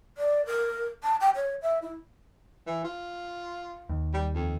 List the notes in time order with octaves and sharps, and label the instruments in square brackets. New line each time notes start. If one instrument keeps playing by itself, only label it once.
[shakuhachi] D5
A#4
A5
G5
C#5
E5
E4
[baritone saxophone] E3
F4
[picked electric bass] D#2
[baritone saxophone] G3
F2